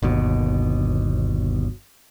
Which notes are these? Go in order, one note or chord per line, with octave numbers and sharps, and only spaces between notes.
G1 D#2 B2